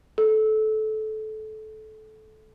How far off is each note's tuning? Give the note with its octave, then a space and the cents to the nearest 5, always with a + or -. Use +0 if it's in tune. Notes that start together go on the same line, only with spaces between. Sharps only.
A4 -20